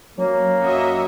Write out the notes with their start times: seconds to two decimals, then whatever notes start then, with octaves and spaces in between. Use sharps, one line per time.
0.18 F#3 A#3 C#4
0.61 F#2 F#4 D#5 E5